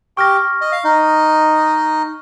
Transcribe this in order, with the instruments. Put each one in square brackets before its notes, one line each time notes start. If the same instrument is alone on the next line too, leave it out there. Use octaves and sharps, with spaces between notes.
[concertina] G4 G5 [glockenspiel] C#6 F6 A#6
[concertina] D#5
F5
D#4 D#5